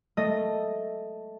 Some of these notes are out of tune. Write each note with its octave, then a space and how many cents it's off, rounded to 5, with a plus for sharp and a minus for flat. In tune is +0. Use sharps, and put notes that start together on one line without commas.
A3 +0 D#5 +0